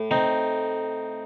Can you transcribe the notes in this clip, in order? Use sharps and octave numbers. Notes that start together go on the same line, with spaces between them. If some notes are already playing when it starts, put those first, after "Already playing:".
Already playing: A2
C4 D#4